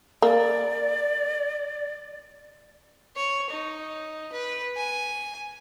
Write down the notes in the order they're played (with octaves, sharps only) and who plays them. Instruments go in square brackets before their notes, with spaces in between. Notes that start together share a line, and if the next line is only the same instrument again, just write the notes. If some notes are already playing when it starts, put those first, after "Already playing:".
[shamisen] A#3 [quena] D5
[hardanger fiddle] C#5
D#4
B4
G#5